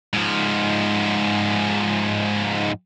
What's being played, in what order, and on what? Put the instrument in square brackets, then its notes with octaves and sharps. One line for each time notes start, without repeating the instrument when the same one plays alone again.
[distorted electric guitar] G#2 F3